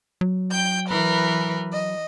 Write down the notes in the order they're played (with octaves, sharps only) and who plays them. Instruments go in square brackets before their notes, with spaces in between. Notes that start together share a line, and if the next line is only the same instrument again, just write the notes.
[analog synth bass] F#3
[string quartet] G5 G6
E3 A#4 B4
D#5